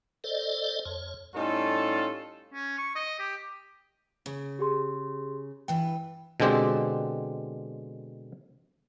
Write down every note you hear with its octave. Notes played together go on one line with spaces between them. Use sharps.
A4 C5 D5 D#5
F2 C#5
A2 G3 C#4 D#4 F4 A4
C#4
C#6
D#5
G4
C#3
G4 G#4 C6
G2 E3 B4 G5
B2 D3 G#3 C4 G4